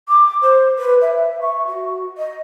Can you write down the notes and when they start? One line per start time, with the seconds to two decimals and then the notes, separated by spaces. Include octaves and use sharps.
0.08 D6
0.42 C5
0.79 B4
1.02 E5
1.41 C#6
1.67 F#4
2.18 D#5